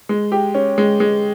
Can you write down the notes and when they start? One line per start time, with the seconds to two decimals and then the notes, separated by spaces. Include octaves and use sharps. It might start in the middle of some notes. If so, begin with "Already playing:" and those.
0.09 G#3
0.32 G4
0.55 C#4
0.78 G#3
1.00 G#3